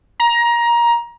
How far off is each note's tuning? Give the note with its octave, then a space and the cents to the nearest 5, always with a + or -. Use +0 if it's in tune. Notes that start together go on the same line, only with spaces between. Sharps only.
A#5 +20